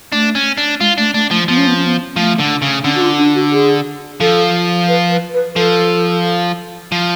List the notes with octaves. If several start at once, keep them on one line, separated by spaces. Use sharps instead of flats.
A3 D4
C#4
D4
G#3 F4
A3 D4
A3 D4
F3 A3
F3 B3
C#4
B3
C#4
B3
F3 A3
D3
C#3
D3 C#4
F#4
F4
D4
F#4
G#4
F3 A4
B4
B4
B4
F3 A4
F3